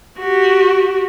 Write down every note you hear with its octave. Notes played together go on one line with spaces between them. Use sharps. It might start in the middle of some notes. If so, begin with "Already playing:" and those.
F#4 G4